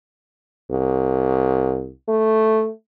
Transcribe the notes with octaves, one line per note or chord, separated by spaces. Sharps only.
C2
A3